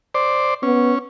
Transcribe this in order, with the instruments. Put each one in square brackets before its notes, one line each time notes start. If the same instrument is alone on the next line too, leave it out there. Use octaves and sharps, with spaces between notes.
[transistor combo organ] C5 D5
[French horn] B3 [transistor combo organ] C#4